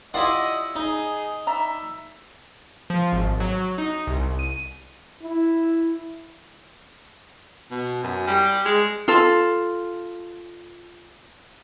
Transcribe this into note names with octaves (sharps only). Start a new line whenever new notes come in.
E4 F4 G4 D5 D#5 F#5
D#4 G#4
D5 E5 A#5 B5
F3
G#1
F#3
D#4
C2
D#7
E4
B2
F#2
G3
G#3
F4 A4